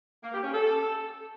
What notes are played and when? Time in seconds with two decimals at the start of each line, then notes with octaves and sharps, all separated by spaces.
0.24 A#3
0.34 G4
0.43 C#4
0.53 A4